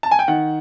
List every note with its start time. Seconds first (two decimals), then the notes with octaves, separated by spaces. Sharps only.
0.03 A5
0.11 G#5
0.19 G5
0.28 D#3 F#5